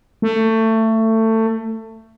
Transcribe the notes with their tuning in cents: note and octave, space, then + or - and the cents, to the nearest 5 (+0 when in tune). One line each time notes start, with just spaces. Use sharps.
A3 +20